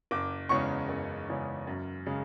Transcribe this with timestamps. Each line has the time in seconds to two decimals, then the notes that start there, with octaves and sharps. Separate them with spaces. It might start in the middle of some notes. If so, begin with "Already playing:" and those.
0.11 F#1 D6
0.49 E2 C#3 G#3 C#4 C#6
0.88 F#1
1.28 E2 C#3 G#3 C#4
1.67 F#2
2.06 C#3 G#3